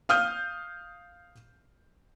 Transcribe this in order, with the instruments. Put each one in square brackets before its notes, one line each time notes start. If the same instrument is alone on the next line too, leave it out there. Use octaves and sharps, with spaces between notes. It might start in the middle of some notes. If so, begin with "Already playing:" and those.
[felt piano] F5 D#6 F6 G6